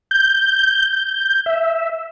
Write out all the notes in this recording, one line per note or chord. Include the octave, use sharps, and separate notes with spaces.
G6
E5